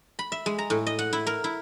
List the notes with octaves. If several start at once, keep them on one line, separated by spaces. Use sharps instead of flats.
B5
E5
G#3
A#5
A2
D#5
F#5
E4
A#4
E4